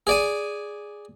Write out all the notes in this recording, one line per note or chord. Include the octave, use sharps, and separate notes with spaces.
G#4 D5 G#5